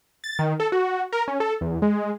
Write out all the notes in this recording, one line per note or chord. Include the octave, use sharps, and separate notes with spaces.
A6
D#3
A4
F#4
A#4
C#4
A4
E2
G#3